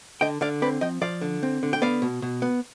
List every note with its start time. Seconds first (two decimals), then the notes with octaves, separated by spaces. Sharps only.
0.21 D3 D#5 G5
0.41 D3 D5 F5
0.62 C4 B4 D5
0.81 F3 D#5 G5
1.01 F3 D5 F5
1.21 D3
1.43 C4
1.63 D3
1.73 G5
1.82 B3 D5 F5
2.02 B2
2.22 B2
2.42 B3